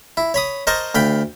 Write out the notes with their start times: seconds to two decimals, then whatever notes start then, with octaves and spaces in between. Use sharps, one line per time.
0.17 E4
0.34 C#5 B5 D#6
0.67 A#4 C5 D#5 A5 C#6
0.95 D2 F5 G5 B5